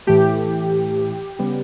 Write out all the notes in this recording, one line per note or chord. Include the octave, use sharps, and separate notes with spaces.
A2 E3 A3 G4
C#3 G3 B3